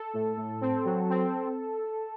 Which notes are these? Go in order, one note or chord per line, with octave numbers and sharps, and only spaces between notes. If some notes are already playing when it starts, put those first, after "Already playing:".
Already playing: A4
A2
A2
C4
F#3
C4